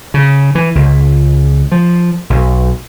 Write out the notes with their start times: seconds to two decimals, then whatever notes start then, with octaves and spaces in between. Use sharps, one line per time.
0.14 C#3
0.55 E3
0.75 C#2
1.72 F3
2.30 B1